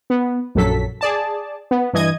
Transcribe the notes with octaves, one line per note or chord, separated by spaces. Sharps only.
B3
A#1 F#2 F#3 A4 B6
G#4 D5 A5
B3
G2 E3 D#5 G#6 D#7